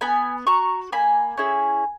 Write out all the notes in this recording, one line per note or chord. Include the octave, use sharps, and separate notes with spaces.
B3 G#5 B5
F#4 A#5 C#6
A#3 G#5 B5
C#4 E4 G#4